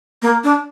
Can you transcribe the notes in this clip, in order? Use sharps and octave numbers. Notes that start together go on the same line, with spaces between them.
A#3
D4